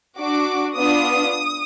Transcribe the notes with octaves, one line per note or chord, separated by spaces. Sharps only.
D4 F#4 D6
B3 D4 F4 D#6